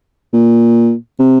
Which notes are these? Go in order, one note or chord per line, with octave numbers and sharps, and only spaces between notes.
A#2
C3